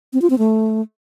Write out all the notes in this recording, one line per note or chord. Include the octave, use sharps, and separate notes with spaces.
C4
F4
C4
A3